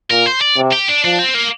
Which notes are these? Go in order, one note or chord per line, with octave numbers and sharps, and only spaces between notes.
A#2 A#4
C5
D5
C3
G4
D4
F3 D4
C4
A#3